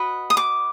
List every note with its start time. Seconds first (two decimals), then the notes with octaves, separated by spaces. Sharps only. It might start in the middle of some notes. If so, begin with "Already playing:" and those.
Already playing: F#4 B4 D#5
0.30 D#6
0.37 D6